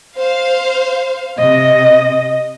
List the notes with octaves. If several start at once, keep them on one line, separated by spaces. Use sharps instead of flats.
C5 F5
C3 D#5